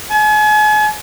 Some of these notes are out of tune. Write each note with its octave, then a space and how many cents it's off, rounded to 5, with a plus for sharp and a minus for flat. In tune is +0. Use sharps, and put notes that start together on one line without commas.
G#5 +40